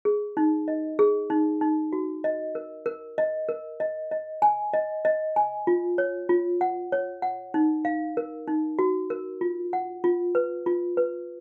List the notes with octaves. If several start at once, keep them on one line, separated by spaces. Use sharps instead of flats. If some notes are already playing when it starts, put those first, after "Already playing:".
G#4
D#4
D#5
G#4
D#4
D#4
F#4
D#5
A#4
A#4
D#5
A#4
D#5
D#5
G#5
D#5
D#5
G#5
F4
C#5
F4
F#5
C#5
F#5
D#4
F5
A#4
D#4
F#4
A#4
F4
F#5
F4
B4
F4
B4